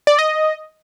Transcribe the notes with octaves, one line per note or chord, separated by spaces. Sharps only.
D5
D#5